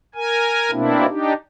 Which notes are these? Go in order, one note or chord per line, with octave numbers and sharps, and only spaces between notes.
A#4 G#5
B2 A#3 C4 D4 E4
D4 D#4 G4